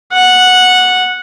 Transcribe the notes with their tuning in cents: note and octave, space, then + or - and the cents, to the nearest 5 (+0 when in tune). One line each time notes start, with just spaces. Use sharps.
F#5 -10